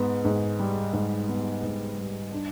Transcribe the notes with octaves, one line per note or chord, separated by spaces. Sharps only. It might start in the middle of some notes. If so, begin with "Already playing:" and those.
Already playing: G#2 B3
G#2
G3
G#2
B3
G#2
G3
D4